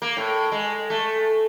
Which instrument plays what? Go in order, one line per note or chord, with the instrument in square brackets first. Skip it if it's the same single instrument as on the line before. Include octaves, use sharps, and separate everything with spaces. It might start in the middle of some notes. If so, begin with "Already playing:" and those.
[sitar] A#3
A2
G#3
A3